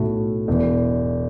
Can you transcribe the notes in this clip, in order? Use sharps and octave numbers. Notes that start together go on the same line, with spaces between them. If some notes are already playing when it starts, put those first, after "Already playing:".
Already playing: B1 A2 A3 F#4
E1 E2 E3